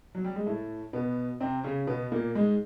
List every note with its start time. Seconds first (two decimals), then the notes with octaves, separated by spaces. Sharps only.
0.15 F#3
0.24 G3
0.36 G#3
0.46 A2 A3
0.93 B2 B3
1.41 C3 C4
1.63 C#3 C#4
1.87 B2 B3
2.12 A#2 A#3
2.35 G#2 G#3